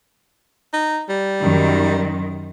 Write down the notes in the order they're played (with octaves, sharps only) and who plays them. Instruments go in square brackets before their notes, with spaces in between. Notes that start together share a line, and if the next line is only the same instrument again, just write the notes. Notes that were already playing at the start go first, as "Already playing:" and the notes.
[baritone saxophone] D#4
G3
[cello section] F#2 D#3